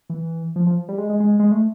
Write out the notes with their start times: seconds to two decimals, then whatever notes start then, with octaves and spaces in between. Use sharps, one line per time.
0.10 E3
0.56 F3
0.67 F3
0.89 G3
0.98 G#3
1.09 G#3
1.20 G#3
1.40 G#3
1.52 A3